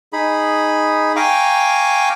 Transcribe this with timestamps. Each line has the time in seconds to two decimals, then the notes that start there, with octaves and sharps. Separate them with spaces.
0.13 D#4 G#4 B5
1.16 F5 G5 G#5 A#5 C#6 D6